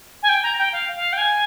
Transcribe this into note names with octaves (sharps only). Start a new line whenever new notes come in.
G#5
G5
A#5
G5
F5
F5
G5
G#5